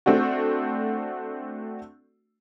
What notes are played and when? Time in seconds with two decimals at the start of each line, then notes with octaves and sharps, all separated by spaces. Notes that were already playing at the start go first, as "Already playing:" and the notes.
0.06 A3 C4 D4 F#4